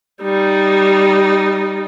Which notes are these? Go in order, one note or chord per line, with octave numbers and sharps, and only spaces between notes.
G3 D#4